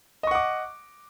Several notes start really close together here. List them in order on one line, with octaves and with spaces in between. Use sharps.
D#5 C#6 F#5 D6